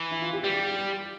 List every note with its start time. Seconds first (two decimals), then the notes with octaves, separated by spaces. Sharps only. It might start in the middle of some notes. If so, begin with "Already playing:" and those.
Already playing: E3
0.11 E4
0.22 F4
0.33 G4
0.44 G3 G4
0.55 G4
0.66 G4
0.78 G4